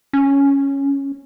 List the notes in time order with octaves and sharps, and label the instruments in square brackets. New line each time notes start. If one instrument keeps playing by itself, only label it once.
[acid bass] C#4